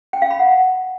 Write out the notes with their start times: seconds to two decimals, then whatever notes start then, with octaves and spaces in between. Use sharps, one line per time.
0.13 G5
0.22 F5
0.30 B5
0.39 F#5